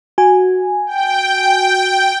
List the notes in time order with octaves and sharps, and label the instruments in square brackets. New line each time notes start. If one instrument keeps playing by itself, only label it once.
[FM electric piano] F#4 G#5
[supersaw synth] G5